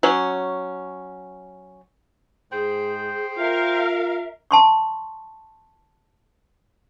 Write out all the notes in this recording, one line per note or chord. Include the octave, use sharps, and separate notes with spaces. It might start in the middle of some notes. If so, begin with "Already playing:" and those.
F#3 C#4
G#2 G#4 C5 G5
F4 A#4 E5 F5
A5 C6 C#6